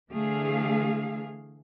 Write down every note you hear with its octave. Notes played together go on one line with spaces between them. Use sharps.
D3 E3 A3 G#4 F5